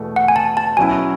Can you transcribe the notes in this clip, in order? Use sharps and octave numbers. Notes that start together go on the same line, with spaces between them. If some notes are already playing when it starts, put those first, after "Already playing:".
Already playing: E2 B2 A3
F#5
G#5
A5
A5
B2 F#3 C#4 E4 G#5